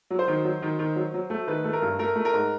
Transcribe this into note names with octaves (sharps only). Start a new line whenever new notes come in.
F#3
C5
D#3
F#3
D#3
D#3
F#3
F#3
A3
D#3 B4
A3
A#4
G2
A3 A#4
A3
A#4
G#2